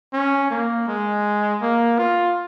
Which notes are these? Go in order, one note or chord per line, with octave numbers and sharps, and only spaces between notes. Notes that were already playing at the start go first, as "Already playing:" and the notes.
C#4
A#3
G#3
A#3
F4